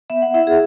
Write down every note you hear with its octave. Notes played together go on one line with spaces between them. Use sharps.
B3 E5
F#5
E4 E5
G#4